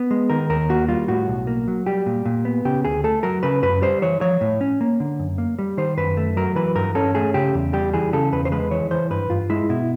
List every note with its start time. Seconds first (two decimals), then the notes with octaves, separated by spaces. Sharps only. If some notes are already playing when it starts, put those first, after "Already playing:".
Already playing: B3
0.11 G#3
0.30 D#3 A#4
0.49 D#2 A#4
0.69 A#3 F#4
0.88 G3 F4
1.08 A2 F#4
1.28 B1
1.47 A#3
1.68 F#3
1.86 G3 G4
2.06 A#2
2.25 A#2
2.45 B3
2.65 C#3 G4
2.85 D2 G#4
3.04 A3 A4
3.23 F#3 A#4
3.43 C#3 B4
3.63 F#2 B4
3.82 G3 C5
4.02 E3 C#5
4.21 F3 C#5
4.41 A2
4.61 C#4
4.81 A#3
5.00 D3
5.19 F#2
5.38 A#3
5.59 G3
5.77 D#3 C5
5.97 F#2 B4
6.17 A3
6.37 F#3 A#4
6.56 E3 B4
6.75 G2 A#4
6.95 C#4 A4
7.15 A3 G#4
7.34 C#3 G4
7.54 E2
7.73 G3 G4
7.93 E3 G#4
8.13 C#3 A4
8.32 E2 B4
8.45 C5
8.52 G#3 B4
8.71 E3 C#5
8.91 E3 C5
9.10 G2 B4
9.30 G2 F4
9.50 G#3 E4
9.69 B2 E4